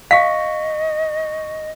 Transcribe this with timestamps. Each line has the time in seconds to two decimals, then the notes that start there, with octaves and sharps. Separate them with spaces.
0.11 D#5 F5 C#6 B6